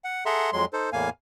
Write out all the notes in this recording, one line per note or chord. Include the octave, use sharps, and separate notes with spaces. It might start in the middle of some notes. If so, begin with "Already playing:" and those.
F#5
G#4 A4 E5 F#5 A#5 C6
F2 F#3 G#3 C6
D#4 A4 C5
E2 A2 A#3 F5 G#5